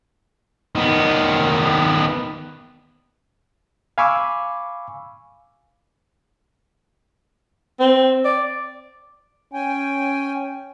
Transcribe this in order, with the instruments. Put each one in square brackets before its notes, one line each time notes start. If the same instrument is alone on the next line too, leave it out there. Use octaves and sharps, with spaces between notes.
[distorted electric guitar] D#3 B3
[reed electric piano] F5 G#5 B5 C#6 D6 E6
[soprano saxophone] C4
D5
[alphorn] C#4 [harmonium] G5 G#5